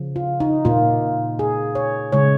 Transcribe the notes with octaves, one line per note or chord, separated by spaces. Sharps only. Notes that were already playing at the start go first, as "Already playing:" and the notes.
Already playing: C#3 F3
F4
D#4
A#2 A#3 F4
G#4
C#5
C#3 G#3 C#5